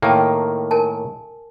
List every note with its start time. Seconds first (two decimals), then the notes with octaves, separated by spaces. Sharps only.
0.02 A2 D#3 A#3 G5 A5
0.71 A#4 G#5 A5